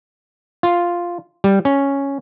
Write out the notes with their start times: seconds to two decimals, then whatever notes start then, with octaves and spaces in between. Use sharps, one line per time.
0.63 F4
1.44 G3
1.65 C#4